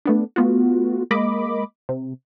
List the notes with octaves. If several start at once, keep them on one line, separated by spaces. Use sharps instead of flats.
A3 B3 D4
A3 B3 F4 F#4
G#3 A#3 D#5 B5 D6
C3